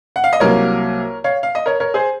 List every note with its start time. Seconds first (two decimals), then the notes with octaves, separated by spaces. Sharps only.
0.16 F#5
0.24 F5
0.33 D#5
0.40 C2 C3 F#3 A#3 A#4 C#5
1.24 C#5 F5
1.43 F5
1.55 D#5
1.66 A#4 C#5
1.80 A#4 C#5
1.94 G#4 C5